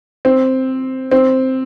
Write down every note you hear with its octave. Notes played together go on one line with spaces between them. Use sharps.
C4
C4